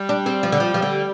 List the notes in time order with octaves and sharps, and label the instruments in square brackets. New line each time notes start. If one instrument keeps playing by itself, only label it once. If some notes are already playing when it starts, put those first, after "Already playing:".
Already playing: [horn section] G3
[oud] D4
C4
F3
D3
F3
F3
D3